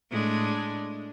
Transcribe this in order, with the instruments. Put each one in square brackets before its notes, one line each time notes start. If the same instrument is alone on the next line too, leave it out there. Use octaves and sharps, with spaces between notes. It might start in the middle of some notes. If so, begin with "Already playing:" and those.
[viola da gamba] A2 G#3 D4